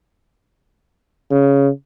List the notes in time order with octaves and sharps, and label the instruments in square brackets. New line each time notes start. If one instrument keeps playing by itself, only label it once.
[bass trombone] C#3